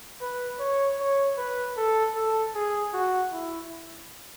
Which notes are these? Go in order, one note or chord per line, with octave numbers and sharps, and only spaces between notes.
B4
C#5
C#5
B4
A4
A4
G#4
F#4
E4